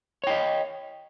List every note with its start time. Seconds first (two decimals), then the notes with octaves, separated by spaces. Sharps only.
0.24 C#5
0.27 G5
0.30 D#5